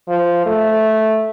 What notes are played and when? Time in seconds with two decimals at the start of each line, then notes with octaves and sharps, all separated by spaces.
0.08 F3
0.46 A3